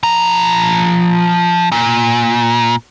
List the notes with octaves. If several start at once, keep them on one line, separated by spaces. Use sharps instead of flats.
F3 A#5
A#2